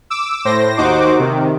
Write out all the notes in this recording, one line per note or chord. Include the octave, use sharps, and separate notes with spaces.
D6 E6
A2 C5 A#6
D#2 D#4 F#4 C5 D6
C3 D#3